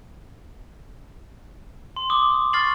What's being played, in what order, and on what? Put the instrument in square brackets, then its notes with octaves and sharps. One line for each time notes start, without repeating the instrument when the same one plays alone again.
[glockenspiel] C6
D6 D#6
C#6 F6 A6 C7 F#7